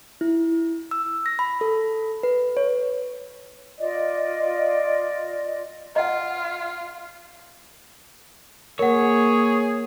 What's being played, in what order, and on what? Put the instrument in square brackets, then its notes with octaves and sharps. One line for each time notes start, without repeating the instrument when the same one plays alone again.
[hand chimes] E4
E6
A#6
B5
A4
B4
C#5
[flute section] F4 D5 D#5
[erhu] F4 [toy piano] D#5 F#5
[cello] A#3 [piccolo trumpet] G#4 [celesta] A#4 F#5 [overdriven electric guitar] C#5